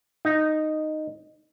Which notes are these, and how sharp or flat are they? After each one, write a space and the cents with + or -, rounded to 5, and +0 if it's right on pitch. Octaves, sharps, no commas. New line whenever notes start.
D#4 -10